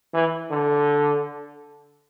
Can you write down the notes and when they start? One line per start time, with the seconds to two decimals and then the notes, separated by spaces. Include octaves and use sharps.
0.14 E3
0.51 D3